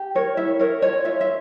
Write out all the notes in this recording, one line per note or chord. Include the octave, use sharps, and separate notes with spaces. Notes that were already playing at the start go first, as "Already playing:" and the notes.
Already playing: G4
A#4 C#5
E4 E5
A#4 C#5
F4 C#5
F4 E5
E5